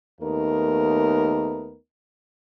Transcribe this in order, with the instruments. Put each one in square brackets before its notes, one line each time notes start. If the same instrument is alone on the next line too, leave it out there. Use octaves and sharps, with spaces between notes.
[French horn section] D#2 A3 B3 D#4 A#4